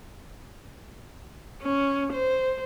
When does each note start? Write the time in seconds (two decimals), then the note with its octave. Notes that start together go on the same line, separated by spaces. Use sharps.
1.63 C#4
2.13 C5